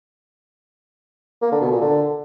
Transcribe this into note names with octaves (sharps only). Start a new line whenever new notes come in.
A#3
D3
B2
A#2
D3